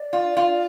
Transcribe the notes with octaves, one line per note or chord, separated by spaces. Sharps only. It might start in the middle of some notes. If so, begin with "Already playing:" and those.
Already playing: D5
F4
F4